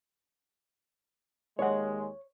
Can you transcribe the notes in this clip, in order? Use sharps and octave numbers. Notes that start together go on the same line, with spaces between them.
D#2 G#3 C#5 F#5